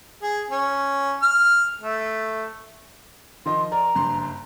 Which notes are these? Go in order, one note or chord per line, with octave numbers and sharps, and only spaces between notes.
G#4
C#4
F6
A3
D#3 F3 D#5 C6
A#4 D5 A#5
F#1 G2 C6